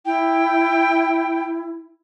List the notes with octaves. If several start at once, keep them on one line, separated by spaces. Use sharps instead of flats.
E4 G5